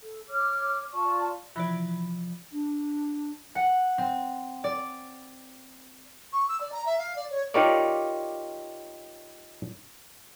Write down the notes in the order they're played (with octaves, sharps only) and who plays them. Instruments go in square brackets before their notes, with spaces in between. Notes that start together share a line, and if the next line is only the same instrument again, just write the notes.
[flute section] A4
C#5 D6 F6
F4 D5 A5 C#6
[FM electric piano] C3 F3 [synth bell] E3 E4 D5
[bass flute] D4
[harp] F#5
C4
D5
[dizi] C#6
E6
D5
A#5
E5
F5
D5
C#5
[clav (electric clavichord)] D#4 F4 G4 A#4 C#5 D5